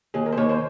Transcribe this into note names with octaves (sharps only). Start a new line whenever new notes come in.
D#2 G#4
A#4
C5
D#2 C#5
C5